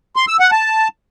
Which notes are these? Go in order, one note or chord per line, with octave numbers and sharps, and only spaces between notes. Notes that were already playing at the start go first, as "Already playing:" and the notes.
C6
E6
F#5
A5